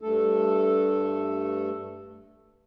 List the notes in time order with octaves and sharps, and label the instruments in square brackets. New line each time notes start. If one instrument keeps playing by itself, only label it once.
[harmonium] G2 A3 A4